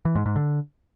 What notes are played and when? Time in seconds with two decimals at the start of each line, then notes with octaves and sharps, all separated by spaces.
0.05 E3
0.15 G#2
0.26 G#2
0.36 D3